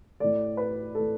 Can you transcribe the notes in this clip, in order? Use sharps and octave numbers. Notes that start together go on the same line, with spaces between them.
A2 A3 D5
B4
A2 A3 A4